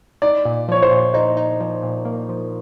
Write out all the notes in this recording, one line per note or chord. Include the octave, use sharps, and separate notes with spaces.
D#4 D5
A#2
F3 C#5
C5
A#2
D#4 C5
D#4
F3
A#2
A#3
F3